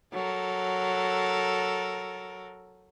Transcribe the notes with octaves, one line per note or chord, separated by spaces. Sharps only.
F#3 A4 A#4